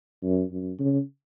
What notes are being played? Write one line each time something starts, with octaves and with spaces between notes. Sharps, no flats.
F#2
F#2
C#3